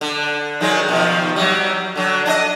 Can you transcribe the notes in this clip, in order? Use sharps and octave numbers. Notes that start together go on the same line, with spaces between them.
D3
D#3 F#3 G#3
B2 D#3 F3
F#3 G3
D3 F#3
D4 F#4 D#5